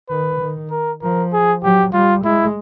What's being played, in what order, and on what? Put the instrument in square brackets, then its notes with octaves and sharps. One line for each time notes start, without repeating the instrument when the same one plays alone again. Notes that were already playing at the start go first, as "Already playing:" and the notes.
[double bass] D#3 [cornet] B4
[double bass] D#3
[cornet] A#4
[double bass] F3 [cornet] A#4
[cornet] G#4
[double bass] F#3 [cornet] G4
[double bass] G3 [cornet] F4
[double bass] G#3 [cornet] E4